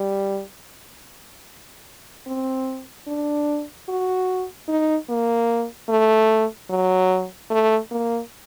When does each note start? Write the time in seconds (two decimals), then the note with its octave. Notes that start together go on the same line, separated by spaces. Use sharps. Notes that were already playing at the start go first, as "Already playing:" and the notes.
Already playing: G3
2.27 C4
3.08 D4
3.89 F#4
4.68 D#4
5.09 A#3
5.89 A3
6.70 F#3
7.50 A3
7.91 A#3